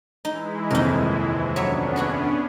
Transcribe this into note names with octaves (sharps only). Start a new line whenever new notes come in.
E3 G#3 D#4 E4
D#1 C2 F2 D#4 A#4
F#3 B3 C#4 D4 C#5 E5
E4 F#4 G#4